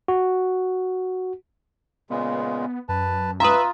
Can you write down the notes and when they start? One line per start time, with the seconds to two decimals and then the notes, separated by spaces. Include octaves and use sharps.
0.08 F#4
2.10 A#2 C#3 G#3 B3
2.89 F#2 B4 A5
3.40 F4 B4 E5 A#5 D#6